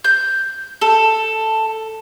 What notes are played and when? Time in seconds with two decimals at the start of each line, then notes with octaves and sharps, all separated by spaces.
0.04 G6
0.81 A4